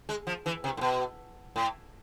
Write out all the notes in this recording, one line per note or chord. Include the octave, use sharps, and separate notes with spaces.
G#3
F3
E3
C3
A2
B2
A2